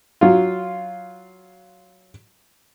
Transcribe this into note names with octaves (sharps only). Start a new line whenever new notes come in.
F#3 F4